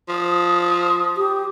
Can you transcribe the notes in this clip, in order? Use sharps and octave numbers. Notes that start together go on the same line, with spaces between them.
F3 D#6
G4